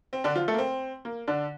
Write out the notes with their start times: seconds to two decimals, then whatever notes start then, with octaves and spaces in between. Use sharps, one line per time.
0.13 C4
0.24 D3 D4
0.35 F3 F4
0.48 A3 A4
0.54 A#3
0.58 C4
1.05 A#3
1.28 D3 D4